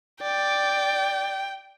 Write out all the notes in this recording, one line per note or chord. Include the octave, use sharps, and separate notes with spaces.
D5 G5